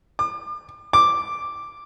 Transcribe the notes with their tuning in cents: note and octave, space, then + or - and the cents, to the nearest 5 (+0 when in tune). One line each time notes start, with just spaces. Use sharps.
D6 +40
D6 +0